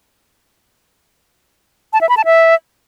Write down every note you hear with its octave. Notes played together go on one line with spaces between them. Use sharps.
A5
E5
B5
A5
E5